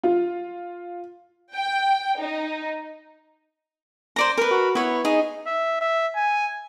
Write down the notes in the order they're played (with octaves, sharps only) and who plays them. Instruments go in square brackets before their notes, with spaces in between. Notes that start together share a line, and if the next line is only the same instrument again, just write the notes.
[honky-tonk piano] F4
[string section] G5
D#4
[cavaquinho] C5 D5 A#5
A#4 B4
[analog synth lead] F#4
[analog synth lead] B3 [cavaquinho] E4 C#5
[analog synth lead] D#4 [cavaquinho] G#4
[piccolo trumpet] E5
E5
G#5